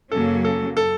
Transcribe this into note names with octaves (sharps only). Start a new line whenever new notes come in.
F#2 C#3 F#3 A#3 C#4 A4
A4
A4